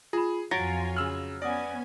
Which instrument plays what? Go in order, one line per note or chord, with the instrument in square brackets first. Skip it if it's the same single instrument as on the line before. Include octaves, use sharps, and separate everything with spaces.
[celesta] F4 B5 [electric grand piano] G#4
[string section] F2 F4 G#5 [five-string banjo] F#3 [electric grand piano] C#5 A#6 [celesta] A6 D7
[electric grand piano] C#3 E6 F6 [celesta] F#7
[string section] B3 C#4 G#5 [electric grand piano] D5 [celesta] F#5 D#6 A#6